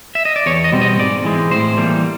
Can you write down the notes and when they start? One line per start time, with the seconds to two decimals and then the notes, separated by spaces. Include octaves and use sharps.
0.15 E5
0.25 D#5
0.36 D5
0.46 E2 C#5
0.64 D#5
0.72 B2 G3 C4
0.81 D#5
0.99 G#2 D5
1.24 E3 G#3 C4
1.51 A2 C5
1.77 E3 G3 A#3